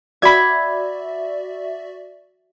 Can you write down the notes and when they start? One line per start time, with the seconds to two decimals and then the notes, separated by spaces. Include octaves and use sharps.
0.22 F#4 D5 E5 B5 G#6